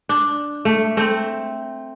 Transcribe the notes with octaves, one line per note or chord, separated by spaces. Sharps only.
D4
A3
A3 C4